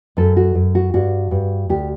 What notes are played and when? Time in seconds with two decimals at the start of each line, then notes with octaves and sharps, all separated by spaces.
0.17 F#2 A4
0.37 F#4
0.55 F#2
0.75 F#4
0.94 G2 F#4
1.31 G2
1.69 D2 G4